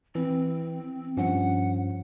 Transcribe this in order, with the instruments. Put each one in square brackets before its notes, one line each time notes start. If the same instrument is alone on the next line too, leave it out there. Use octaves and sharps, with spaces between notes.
[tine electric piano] E3 [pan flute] C4
[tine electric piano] G2 F3 C#4 [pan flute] F#5